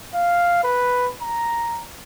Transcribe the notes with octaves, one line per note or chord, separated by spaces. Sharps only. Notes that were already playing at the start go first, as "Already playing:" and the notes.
F5
B4
A#5